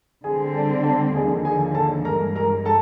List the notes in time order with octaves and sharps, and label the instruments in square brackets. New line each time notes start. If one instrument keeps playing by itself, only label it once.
[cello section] D3 G3 C4 [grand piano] G#4 G#5
[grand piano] A4 A5
A4 A5
[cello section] D#2 D3 F3 [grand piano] G#4 G#5
[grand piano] G#4 G#5
A4 A5
[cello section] G2 E3 G#3 [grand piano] A#4 A#5
[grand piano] A#4 A#5
A4 A5